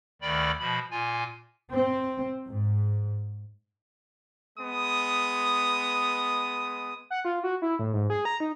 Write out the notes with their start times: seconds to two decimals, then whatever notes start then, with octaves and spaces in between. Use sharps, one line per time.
0.22 D2 D#3 D5 G5 B5
0.60 B2 F3 B5
0.91 A#2 F4 G#5
1.71 C4
2.48 G#2
4.58 G#3 B3 D#6
7.10 F#5
7.25 F4
7.43 F#4
7.62 E4
7.79 A2
7.93 G#2
8.10 G#4
8.25 A#5
8.40 D#4